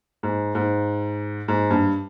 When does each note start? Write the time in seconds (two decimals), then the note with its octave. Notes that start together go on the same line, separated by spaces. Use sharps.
0.23 G#2
0.55 G#2
1.48 G#2
1.70 G2